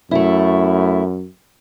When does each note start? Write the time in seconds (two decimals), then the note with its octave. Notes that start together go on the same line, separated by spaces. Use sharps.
0.11 F#2 A3 E4